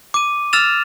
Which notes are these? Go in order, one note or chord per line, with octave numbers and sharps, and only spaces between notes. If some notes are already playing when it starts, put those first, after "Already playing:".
D6 D#7
E6 F6 A6 E7 F7